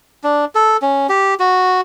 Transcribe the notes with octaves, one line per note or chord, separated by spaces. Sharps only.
D4
A4
C#4
G4
F#4